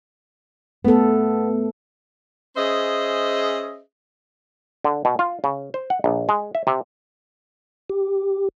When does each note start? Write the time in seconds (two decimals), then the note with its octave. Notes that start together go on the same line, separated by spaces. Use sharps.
0.85 A3 B3 A4
2.57 C#4 G#4 C5 D#5 E5
4.84 D3
5.05 B2
5.19 F4
5.44 C#3
5.74 C5
5.90 F#5
6.04 A#1
6.29 G#3
6.55 E5
6.67 C3
7.90 G4